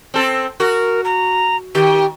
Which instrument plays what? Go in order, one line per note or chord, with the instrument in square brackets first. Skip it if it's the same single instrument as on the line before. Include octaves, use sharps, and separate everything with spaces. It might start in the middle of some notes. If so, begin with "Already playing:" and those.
[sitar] C4 A4
[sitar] F#4 [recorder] A#4
[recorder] A#5
[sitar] D#3 [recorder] G4